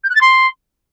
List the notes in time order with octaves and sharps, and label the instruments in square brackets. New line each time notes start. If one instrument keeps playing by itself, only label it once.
[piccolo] G6
F#6
A6
C6